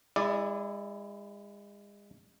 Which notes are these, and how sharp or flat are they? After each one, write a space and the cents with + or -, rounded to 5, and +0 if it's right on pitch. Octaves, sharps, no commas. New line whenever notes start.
G#3 -35 E4 +0 D5 +0